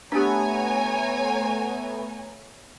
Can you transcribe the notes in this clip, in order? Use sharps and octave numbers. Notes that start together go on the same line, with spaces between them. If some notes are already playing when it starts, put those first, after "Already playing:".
A3 B3 D4 G4 C#5 G#5 A#5